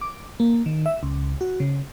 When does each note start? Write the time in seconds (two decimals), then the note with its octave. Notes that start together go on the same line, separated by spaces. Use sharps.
0.01 D6
0.40 A#3
0.66 D#3
0.86 E5
1.03 C#2
1.41 F#4
1.60 C#3